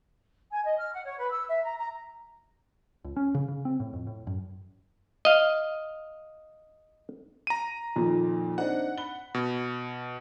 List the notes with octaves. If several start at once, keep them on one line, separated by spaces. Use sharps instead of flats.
G#5
D#5
F6
F#5
C#5
B4
E6
E5
A#5
A#5
C#2
C#4
C#3
C#3
C4
A2
F2
A2
F#2
D#5 F5
A#5 D#7
F2 A#2 D#3
C4 D4 D#4 F#5
B5 G7
B2